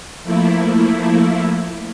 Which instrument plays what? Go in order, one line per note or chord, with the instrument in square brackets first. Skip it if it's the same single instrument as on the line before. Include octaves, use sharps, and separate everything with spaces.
[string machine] F3 A3 A#3 E4